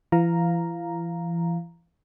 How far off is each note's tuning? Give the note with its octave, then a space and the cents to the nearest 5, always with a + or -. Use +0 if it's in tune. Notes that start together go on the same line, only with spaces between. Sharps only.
E3 +40 F5 +0 A#5 +0